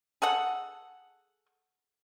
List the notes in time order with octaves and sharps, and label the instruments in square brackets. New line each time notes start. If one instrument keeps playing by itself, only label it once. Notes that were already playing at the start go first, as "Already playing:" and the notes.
[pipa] G#4 A4 F#5